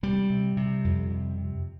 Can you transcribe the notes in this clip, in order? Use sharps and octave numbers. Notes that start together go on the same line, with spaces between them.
C3 G3
C3
C3
F2
C3
C3